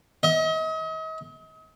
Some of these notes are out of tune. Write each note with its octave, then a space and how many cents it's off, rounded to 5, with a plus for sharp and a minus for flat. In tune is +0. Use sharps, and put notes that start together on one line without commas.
D#5 +40